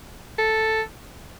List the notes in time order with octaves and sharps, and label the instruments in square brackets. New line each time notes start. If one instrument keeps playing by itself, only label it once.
[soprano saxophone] A4